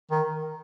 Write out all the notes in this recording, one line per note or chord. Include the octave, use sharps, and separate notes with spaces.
D#3